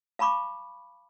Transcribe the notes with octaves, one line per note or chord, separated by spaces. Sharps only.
F5 A5 B5 C#6 D6